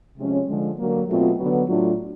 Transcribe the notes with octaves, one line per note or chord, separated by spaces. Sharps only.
C3 F3 G#3 C#4
D3 F3 G#3
D3 F#3 A#3
B2 F#3 A3 C4 F4
D3 F#3 B3
A2 F#3 A3 D4 F4